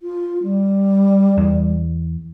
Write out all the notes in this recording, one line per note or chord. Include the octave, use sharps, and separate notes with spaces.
F4
G3
E2